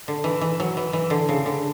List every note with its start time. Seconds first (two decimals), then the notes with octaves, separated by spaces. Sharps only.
0.08 D3
0.24 E3
0.41 E3
0.60 F#3
0.77 E3
0.93 E3
1.10 D3
1.29 C#3
1.46 D3